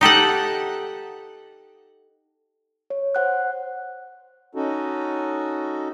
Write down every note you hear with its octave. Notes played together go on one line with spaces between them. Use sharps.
D#4 G4 A4 F#5
C#5
C5 F#5 F#6
C#4 D#4 F#4 A4